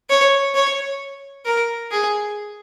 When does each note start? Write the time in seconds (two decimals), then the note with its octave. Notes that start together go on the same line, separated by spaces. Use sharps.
0.10 C#5
0.55 C#5
1.45 A#4
1.91 G#4